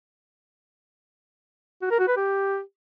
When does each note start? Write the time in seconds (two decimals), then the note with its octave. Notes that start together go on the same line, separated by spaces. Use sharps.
1.82 F#4
1.91 A#4
1.99 F#4
2.08 B4
2.17 G4